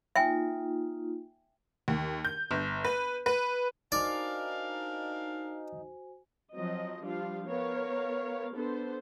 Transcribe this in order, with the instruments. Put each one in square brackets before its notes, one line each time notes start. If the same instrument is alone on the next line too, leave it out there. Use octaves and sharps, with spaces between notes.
[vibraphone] A#3 D#4 F4 [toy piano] E5 G5 G#5
[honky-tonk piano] D#2
G6
G1
B4
B4
[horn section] D4 A#4 F5 [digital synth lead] D#4 [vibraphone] F#4 C5 G#5 [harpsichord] D5
[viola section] F3 F#3 C4 D#5
F3 G3 D4 F4 F5
B3 A#4 C#5 F5
B3 D4 A4 C5